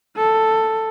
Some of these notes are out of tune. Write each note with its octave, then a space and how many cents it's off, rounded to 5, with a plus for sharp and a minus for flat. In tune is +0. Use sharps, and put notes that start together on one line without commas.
A4 +5